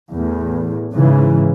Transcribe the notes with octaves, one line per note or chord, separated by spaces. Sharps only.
E2 A2
G#2 C#3 E3